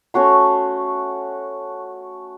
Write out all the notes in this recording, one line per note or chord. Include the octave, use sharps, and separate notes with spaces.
A3 C#4 F#4 C6